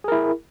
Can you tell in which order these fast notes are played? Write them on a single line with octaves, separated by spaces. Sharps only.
G#4 A#4 E4